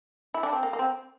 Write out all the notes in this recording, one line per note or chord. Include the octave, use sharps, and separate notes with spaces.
E4
D4
C4
A#3
A#3
C4